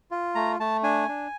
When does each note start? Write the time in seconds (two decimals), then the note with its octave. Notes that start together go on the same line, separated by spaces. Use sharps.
0.11 F4
0.35 A3 A#5
0.60 A3 A5
0.83 D4 G#5
1.08 D4